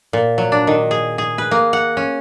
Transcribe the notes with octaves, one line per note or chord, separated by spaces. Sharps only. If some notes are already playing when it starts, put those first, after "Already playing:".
A#2
F#3
D4
D#3
G#4
G#4
B4
A#3
F#5
C#4